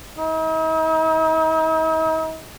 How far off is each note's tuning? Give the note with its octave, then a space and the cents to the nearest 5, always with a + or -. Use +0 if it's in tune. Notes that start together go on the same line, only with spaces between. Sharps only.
D#4 +45